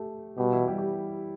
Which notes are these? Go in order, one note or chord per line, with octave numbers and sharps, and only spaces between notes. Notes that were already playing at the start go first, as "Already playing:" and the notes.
Already playing: A3 G4 A4
B2 G3 G4
E3 E4
G3 G4
G4